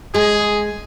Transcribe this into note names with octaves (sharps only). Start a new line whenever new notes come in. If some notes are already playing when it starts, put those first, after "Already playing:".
G#3 G#4